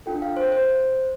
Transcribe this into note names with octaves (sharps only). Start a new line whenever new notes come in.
D4 F4 A4 G5
F5
C5
C5